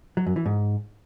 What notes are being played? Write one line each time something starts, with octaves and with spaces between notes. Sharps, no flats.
F#3
F#2
E3
G#2